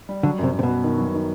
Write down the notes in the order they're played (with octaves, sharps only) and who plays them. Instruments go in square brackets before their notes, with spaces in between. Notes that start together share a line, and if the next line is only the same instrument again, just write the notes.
[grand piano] G3
[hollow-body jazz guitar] D3 [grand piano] F#3
[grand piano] F#2 [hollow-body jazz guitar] C3
[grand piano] F#2
[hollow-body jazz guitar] C3
B2
[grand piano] B3
D#3
F#3
D#3